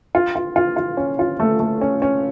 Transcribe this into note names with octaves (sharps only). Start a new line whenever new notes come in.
F4
F4
F4
F4
C#4
F4
A3
A3
C#4
C#4